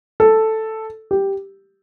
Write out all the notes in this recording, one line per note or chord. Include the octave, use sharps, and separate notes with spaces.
A4
G4